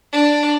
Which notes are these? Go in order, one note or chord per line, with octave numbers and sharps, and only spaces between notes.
D4